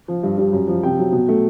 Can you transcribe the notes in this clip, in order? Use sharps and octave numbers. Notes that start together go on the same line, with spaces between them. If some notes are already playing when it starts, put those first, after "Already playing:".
F3
G2
G3
F#2
F3
C3 G5
F#3
B2
A3